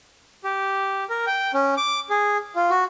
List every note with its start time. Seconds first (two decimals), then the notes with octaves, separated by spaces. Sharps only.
0.44 G4
1.09 A#4
1.27 G5
1.54 C#4
1.77 D6
2.10 G#4
2.56 F4
2.70 F#4